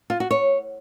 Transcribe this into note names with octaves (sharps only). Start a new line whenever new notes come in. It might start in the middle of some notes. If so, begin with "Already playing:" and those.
F4
F#4
C#5